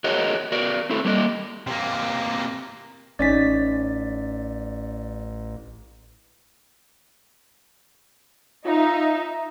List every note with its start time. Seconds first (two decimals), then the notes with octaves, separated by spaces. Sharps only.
0.04 F#4 G#4 A#4 C#5 D#5
0.52 F#4 A#4 D5
0.90 C4 E4 A4
1.05 G3 A#3 C5 D#5
1.67 C3 A#3
3.19 A1 C#4 D#4 D5 A6 B6
8.66 D#4 F4 E5